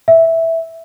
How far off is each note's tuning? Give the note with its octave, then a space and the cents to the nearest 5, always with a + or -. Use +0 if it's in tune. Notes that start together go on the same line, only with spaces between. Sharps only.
E5 -5